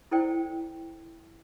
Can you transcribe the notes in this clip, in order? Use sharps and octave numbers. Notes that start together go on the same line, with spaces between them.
E4 A4 C5 D5 G5